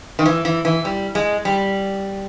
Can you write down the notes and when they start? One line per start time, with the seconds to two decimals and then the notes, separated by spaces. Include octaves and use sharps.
0.19 D#3
0.26 E3
0.45 E3
0.65 E3
0.85 G3
1.15 G#3
1.45 G3